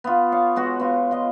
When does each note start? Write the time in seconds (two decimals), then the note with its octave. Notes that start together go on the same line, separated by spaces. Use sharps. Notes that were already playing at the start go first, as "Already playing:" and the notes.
0.04 B3 F4
0.32 C#5 F5
0.56 G#3 B3 F#4
0.80 B3 F4
1.11 F4 D#5